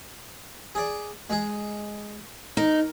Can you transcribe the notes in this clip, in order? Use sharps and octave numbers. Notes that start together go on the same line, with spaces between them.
G#4 D5
G#3 G#4
D#4 A#4